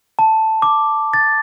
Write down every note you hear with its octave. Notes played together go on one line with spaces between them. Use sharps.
A5
D6
A6